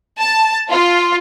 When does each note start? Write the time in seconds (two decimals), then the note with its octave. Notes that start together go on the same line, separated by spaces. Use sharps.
0.20 A5
0.69 F4